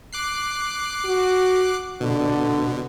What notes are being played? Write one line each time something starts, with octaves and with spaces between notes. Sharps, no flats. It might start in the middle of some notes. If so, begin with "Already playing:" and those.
D6 F#6 C7
F#4
B2 D3